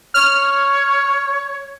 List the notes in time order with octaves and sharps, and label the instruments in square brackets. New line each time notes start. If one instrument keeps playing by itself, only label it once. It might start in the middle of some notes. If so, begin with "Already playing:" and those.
[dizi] C#5 [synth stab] F6